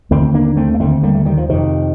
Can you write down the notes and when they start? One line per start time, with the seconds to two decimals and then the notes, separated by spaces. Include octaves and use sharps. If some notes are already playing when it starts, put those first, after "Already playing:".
0.11 D#2 D3 A3 C4
0.34 A#3 D4
0.56 A3 C4
0.74 A#3
0.79 D#2 D3 A3 C4
1.03 G3 A#3
1.15 A3
1.25 D#3 G3
1.37 F3
1.49 F2 C3 D#3